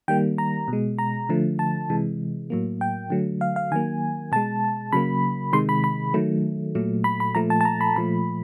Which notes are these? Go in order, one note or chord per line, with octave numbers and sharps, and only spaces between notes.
D#3 G3 A#3 G5
A#5
B2
G#3
A#5
D3 F3 A3
A5
C3 E3 G#3
A2 F#3 A#3
G5
D3 F#3 A3
F5
F5
D#3 F#3 A#3 G#5
B2 G#3 A5
C#3 F#3 A#3 B5
C3 D#3 G#3 C6
B5
B5
D#3 F#3 A3
A#2 F#3 A3
B5
B5
A#2 F3 A3 A#5
A5
A5
A#5
B5
A#2 F3 A3 B5